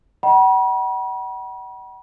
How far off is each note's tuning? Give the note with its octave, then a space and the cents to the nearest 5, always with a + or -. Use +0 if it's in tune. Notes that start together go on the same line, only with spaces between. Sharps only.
D#5 +0 F#5 +40 B5 -40